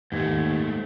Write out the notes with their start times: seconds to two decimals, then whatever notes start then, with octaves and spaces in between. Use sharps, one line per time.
0.12 D#2 G#2 A3 G#6